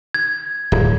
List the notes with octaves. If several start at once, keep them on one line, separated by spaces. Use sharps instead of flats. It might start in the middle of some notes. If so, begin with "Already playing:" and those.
G#6
D1